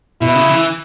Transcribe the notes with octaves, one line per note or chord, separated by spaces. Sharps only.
B2 E4
C#3
E3